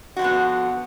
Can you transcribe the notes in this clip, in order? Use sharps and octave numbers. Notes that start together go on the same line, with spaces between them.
D3 F3 B3 F#4